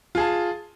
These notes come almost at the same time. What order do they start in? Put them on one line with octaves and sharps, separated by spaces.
F4 G#4 A5